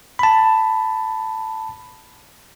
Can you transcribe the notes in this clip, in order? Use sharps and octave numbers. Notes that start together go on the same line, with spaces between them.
A5 B5